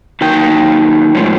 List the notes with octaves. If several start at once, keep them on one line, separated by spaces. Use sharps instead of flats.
D#3 F#3 A#3 D#4 G5
A2 F3 G#3 C#4